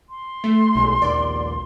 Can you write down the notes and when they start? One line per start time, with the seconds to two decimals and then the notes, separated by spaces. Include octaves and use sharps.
0.09 C6
0.44 A3
0.75 B1 G#3
1.02 A#1 D#2 D5